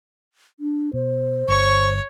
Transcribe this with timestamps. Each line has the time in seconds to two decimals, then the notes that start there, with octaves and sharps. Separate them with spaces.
0.60 D4
0.93 B2 C5
1.48 G1 C#5 C#6